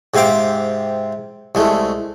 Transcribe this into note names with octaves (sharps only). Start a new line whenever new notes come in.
G#2 C3 C4 F5 G5 D6
C2 G#3 A3